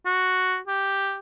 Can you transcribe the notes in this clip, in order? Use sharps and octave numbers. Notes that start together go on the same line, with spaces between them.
F#4
G4